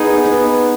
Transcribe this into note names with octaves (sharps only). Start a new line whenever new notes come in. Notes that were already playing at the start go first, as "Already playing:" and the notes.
Already playing: B3 D#4 G#4
B3